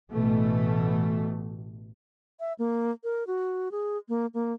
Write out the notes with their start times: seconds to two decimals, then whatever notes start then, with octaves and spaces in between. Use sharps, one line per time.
0.11 A1 B2 E3 A3
2.40 E5
2.59 A#3
3.04 A#4
3.27 F#4
3.72 G#4
4.09 A#3
4.34 A#3